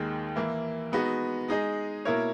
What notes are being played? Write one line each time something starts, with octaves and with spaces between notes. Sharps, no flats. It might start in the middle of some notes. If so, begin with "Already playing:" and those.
Already playing: D#2 D#3 G#3
E3 A#3 E4
G#3 B3 D#4 F#4
G#3 D#4 G#4 D#5
B2 A#3 E4 A#4 C#5